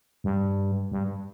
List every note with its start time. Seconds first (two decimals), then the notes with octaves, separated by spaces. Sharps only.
0.24 G2
0.92 G2